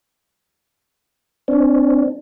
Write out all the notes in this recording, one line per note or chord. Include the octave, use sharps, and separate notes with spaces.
C4 D4